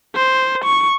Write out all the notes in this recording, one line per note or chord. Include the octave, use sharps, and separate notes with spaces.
C5
C#6